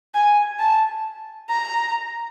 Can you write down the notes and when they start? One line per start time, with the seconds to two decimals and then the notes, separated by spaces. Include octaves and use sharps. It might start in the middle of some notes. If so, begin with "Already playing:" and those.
0.14 G#5
0.59 A5
1.50 A#5